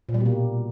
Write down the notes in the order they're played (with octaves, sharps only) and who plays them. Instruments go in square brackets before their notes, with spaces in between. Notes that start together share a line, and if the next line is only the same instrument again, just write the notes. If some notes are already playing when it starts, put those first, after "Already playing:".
[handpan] A#2
G3
B2
A#3